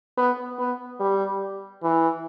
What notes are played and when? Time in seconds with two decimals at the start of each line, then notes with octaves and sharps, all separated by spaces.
0.17 B3
0.59 B3
1.00 G3
1.83 E3